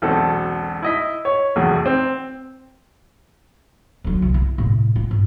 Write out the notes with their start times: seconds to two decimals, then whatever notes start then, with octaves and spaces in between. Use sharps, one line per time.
0.02 E1 B1 C4 A4
0.83 E4 D#5 B6
1.25 C#5
1.56 F1 B1 E2 A3 G#4
1.86 C4
4.04 D3 F#3
4.22 C2
4.34 E4
4.58 A2 C3
4.96 F4
5.11 G#2